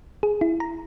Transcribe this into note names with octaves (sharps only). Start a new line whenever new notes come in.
G#4
E4
A#5